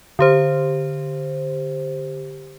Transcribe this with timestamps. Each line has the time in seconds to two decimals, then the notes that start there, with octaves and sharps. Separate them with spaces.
0.19 D3 G4 C5